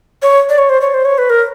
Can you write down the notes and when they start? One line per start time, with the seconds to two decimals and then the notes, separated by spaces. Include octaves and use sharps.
0.22 C#5
0.49 D5
0.58 C#5
0.69 C5
0.81 C#5
0.94 C5
1.05 C#5
1.18 B4
1.30 A#4